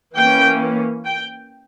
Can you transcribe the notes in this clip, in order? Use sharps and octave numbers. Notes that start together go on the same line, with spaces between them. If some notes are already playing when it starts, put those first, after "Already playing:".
E3 A#3 C#4 G5
G5